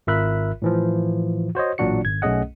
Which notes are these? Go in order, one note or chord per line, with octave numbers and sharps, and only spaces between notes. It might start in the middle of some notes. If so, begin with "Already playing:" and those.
G#1 F4 A#4 E5 B5 F#6
A2 E3 F3
F#4 C5 C#5 D#5
A1 A#2 F#3 D4 F#4 C#7
G#1 G#6
B1 A3 C#4 G#4 D#5 F#5